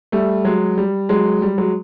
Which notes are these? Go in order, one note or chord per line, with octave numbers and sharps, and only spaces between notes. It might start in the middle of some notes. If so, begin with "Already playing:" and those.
G3 A3
F#3 G#3
G3
F#3 G#3
G3
F#3 G#3